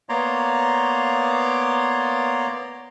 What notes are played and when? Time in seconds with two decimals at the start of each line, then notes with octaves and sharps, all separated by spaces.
0.09 A#3 B3 C#5 D5 A#5 C6